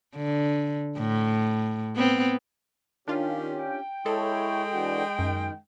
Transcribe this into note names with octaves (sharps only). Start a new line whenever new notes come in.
D3
A2
B3 C4
D#3 C#4 D4 F4 G4
G5
G#3 E4 A4 C#5
E3 D4 F#4
F#2 D#3